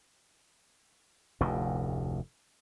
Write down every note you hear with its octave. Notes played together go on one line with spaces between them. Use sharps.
F1 D2 A2